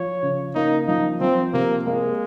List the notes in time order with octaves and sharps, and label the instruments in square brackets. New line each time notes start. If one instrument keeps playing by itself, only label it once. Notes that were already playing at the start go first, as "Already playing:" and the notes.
Already playing: [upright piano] F3 [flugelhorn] C#5
[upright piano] C#3
[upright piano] A#3 [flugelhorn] D#4
[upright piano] F3 [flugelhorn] D#4
[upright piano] F3 [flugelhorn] C4
[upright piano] C3 [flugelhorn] A#3
[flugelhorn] G#3 [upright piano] A#3